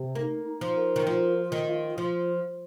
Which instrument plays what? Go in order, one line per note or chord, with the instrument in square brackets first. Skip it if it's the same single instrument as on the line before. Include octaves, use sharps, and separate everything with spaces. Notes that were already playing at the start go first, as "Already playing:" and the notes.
Already playing: [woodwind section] C3
[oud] A#3 [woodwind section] D#4
[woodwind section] D#4
[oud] F3
[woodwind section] A#3
[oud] D#3
[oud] F3 [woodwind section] F4
[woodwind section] F4
[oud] D#3
[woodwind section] F4
[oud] F3 [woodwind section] F4